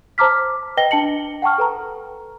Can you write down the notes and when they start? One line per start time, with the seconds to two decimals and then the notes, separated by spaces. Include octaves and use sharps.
0.18 C5 A5 A#5 D6 F6 B6
0.77 B4 D#5 G5 A#6 G7
0.91 D4 A5 C#7 F#7
1.42 F#5 G5 A5 C#6 F6
1.58 A4 B4 A#5